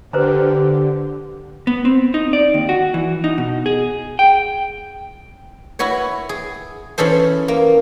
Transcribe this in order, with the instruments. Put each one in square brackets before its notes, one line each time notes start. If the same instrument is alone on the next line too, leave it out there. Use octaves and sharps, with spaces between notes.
[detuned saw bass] D3 [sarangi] G4 [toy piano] B4 C5 A#5
[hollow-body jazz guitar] B3
C4
D#4
D5
D#2
F#4
E3
D#4
B2
G#4
G5
[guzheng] E4 F#4 B4 C#5
G#4
E3 C#4 G#4 A4 C5
A#3